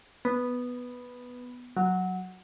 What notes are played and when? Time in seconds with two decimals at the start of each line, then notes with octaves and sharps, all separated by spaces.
0.25 B3
1.77 F#3